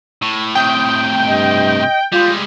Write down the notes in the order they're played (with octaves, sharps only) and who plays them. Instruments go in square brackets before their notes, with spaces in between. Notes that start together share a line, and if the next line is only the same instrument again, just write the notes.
[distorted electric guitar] A2
[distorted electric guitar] A2 C3 [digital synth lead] G5 [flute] D#6
[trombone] G2 [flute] D#5
[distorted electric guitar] G3 G#3 [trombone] F4 [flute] G6